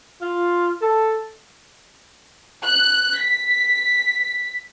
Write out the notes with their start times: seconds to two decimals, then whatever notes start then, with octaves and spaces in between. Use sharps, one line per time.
0.22 F4
0.82 A4
2.63 F#6
3.22 B6